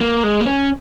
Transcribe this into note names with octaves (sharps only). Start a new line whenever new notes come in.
A#3
G#3
A#3
C#4